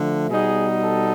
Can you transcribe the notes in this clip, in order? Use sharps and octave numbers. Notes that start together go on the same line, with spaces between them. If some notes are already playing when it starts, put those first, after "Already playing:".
Already playing: D3 F3 A3
B2 G3 B3 D#4 G#4
A4